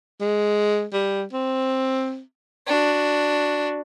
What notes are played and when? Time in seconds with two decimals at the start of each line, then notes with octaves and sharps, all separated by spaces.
0.21 G#3
0.93 G3
1.33 C4
2.66 D4 F#4